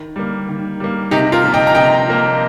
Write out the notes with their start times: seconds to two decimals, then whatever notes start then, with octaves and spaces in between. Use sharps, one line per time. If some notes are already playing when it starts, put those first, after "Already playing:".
Already playing: D#3
0.16 G3 A#3
0.49 D#3
0.80 G3 A#3
1.11 C3 D#4 G4
1.32 F4 A#4
1.43 F3 A#3
1.54 D#5 G5
1.67 A#5
1.75 C3 D#5 G5
2.07 F3 A#3